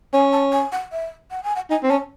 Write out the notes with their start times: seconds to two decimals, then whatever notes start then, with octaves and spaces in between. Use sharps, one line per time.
0.13 C#4 G#5
0.32 A5
0.52 G#5
0.72 F#5
0.92 E5
1.31 F#5
1.44 G#5
1.56 F#5
1.70 D#4 G#5
1.83 C4
1.90 C#4 A5